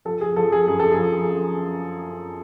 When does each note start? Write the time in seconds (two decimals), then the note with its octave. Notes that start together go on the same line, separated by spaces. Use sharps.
0.05 F3 A4
0.21 G#4
0.36 F3 A4
0.52 G#4
0.67 F#2 G#4
0.80 A4
0.92 G#4
0.98 F3